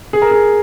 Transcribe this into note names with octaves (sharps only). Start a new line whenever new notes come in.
G#4
A#4
G#4